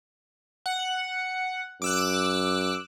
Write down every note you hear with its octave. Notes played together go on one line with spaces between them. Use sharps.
F#5
F#2 D6 E6 F#6